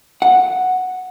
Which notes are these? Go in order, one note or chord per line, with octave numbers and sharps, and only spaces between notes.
F#5